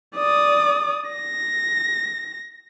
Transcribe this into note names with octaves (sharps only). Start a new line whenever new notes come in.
D5 D#6
A#6